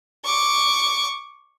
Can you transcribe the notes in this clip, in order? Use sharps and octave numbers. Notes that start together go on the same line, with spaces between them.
C#6 D6